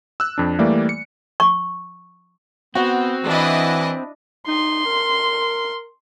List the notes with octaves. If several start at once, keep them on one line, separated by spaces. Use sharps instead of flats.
E6 F#6
F2 D4
E3 G3 A3 A#3 D5
C#7
C#6
B3 C4 F#4
E3 D4 E4 D#5
D#4 C6
A#4